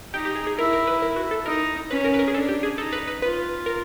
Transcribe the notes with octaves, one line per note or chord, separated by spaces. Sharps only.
D#4 G4
G4
G#4
G#4
E4 A#4
A#4
B4
A#4
F#4
A4
D#4 A#4
C#4 B4
A#4
B4
A#4
G#4
D4 A4
G4
G#4
D#4 A4
B4
B4
F4 B4
A#4